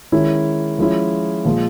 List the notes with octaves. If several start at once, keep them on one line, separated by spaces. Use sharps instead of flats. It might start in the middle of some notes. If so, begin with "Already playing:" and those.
D#3 G#3 C#4 E4
F3 G#3 C#4 E4
A#2 F3 G#3